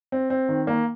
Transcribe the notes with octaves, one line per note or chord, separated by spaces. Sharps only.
C4
C4
D#3
A#3